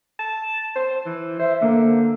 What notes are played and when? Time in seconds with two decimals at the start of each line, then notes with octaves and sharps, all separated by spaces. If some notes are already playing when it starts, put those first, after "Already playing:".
0.19 A5
0.76 C5
1.06 E3
1.39 C5 E5
1.61 D3 A#3